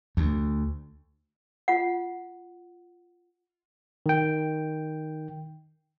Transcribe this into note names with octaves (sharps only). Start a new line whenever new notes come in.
D2
F4 F#5
D#3 G5